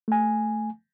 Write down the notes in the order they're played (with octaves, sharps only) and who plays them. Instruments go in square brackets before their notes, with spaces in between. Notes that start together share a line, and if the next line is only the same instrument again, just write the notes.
[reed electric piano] A3 G#5